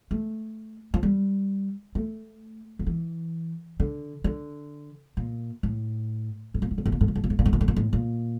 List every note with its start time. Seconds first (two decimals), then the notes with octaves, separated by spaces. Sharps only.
0.11 A3
0.94 F3
1.03 G3
1.95 A3
2.79 D3
2.87 E3
3.80 D3
4.24 D3
5.17 A#2
5.63 A2
6.54 A2
6.62 A#2
6.71 A2
6.78 A#2
6.86 A2
6.92 A#2
7.01 A2
7.08 A#2
7.15 A2
7.24 A#2
7.30 A2
7.39 A#2
7.46 A2
7.53 A#2
7.61 A2
7.68 A#2
7.76 A2
7.93 A#2